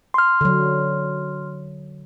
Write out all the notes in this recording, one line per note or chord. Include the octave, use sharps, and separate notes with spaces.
C6 F6
D3 F#3